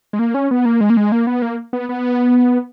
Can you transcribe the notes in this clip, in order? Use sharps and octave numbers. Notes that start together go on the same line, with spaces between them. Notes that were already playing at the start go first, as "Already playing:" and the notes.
G#3
A#3
C#4
B3
A#3
G#3
A#3
G#3
A#3
B3
A#3
B3
B3